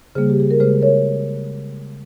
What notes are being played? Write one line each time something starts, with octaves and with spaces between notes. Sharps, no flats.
C#3 G3 A#3 G#4 C5
G4
G#4
A#4
C#3 G#3 G#4 C5
A#4 C#5